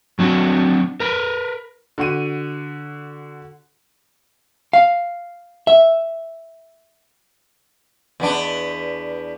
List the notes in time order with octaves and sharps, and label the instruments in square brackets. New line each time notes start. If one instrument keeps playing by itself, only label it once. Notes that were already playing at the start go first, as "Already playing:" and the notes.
[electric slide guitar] F#3 C4 D4 F#4
A#4 B4
[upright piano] D3 F#4 D#7
[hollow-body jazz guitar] F5
E5
[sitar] E2 B3 D4